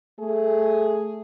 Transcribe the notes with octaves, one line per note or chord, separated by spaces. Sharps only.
A3 G#4